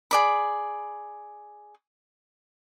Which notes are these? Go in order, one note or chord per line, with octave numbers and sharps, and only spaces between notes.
G#4 D5 B5